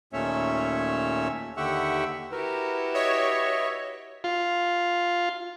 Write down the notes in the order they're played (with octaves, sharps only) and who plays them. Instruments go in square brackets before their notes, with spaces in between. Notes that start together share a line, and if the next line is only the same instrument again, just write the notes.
[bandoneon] D#2 A#2 A3 C#4 C#5 E5
D#2 D3 G4 E5 F#5 C#6
[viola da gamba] E4 F#4 G4 [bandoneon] A#4 [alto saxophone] B4
[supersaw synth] C#5 [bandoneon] D#5 E5
[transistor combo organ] F4